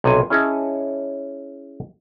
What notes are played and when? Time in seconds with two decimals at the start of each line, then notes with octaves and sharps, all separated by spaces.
0.04 B1 C3 G#5
0.30 C#4 E4 G#4 C#5 D#5 A5